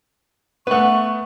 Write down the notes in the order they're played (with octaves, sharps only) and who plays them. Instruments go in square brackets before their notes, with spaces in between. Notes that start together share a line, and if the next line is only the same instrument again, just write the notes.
[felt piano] A3 B3 [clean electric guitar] B4 F#5 [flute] C#6